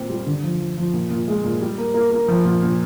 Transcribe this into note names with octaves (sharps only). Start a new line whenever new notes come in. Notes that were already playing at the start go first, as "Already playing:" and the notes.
Already playing: A#2 C4
G3
D3
F3
F3
F3
A#2
A#2
G#3
A#2
G3
A#3
A#3
A#3
F3
A#2
A#2